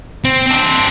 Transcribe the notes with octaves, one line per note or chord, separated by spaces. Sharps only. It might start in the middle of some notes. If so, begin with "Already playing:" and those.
C4
C4 D4